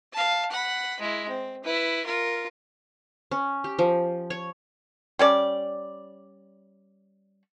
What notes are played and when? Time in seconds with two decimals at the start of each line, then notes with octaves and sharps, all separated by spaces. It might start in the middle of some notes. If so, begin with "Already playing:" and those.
0.13 F5 A5
0.51 F#5 B5
1.00 G#3 E4
1.29 C4
1.64 E4 B4
2.05 F4 A#4
3.31 C#4
3.64 G4
3.79 F3
4.30 C#5
5.19 G3 C#4 D5